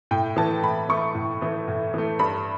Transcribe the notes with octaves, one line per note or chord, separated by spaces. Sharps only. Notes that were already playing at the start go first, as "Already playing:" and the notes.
A2 G5
E3 A3 A5
A2 B5
E3 A3 C#6
A2
E3 A3
A2
E3 A3
G2 B5